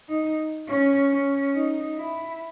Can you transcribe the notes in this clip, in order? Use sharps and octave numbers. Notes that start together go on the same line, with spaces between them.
D#4
C#4
C#4
D#4
E4